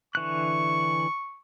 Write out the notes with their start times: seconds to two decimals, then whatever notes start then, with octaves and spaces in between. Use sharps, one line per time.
0.15 D3 E3 C#6 F#6